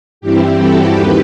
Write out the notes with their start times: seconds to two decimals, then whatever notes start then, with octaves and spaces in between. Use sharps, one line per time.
0.21 G2 E3 G3 C4 E4 G4
0.57 F#4 A4
0.92 D#2 D#3 G4 B4